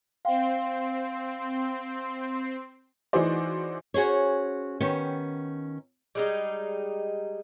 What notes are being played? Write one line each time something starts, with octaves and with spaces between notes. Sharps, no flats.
C4 F5 G5 C6
E3 D#4 F#4 G#4 C5 D5
C#4 F#4 G#4 C5 C#5
D#3 B3 C#4 G4
G3 G#3 D#4